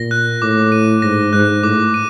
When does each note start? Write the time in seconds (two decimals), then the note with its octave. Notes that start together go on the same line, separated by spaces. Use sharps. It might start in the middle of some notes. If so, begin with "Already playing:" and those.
Already playing: A#2 A#6
0.11 F#6
0.42 A2 D6
0.72 D#7
1.02 G#2 A#6
1.33 G#2 F#6
1.63 A2 D6
1.94 D#7